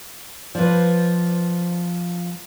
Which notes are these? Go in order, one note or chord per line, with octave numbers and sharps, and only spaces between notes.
F3 B4 C5 D5